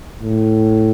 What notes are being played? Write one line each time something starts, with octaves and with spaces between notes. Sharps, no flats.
A2